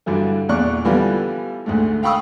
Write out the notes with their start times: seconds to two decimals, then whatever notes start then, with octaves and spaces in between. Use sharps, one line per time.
0.06 G2 D3 E3 F#3
0.49 E2 A#2 D5 C#6 F#6
0.85 D3 E3 F3 G3 B3
1.66 D2 G#2 A3
2.03 F5 G5 B5 C#6 D#6 E6